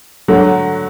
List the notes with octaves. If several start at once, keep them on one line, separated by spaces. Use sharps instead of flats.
D3 F#3 A3